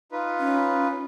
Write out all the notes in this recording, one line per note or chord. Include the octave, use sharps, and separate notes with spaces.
D#4 F4 B4
C#4